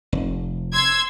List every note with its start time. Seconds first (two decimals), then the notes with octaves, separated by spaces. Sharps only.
0.13 F1
0.74 C6 E6 G#6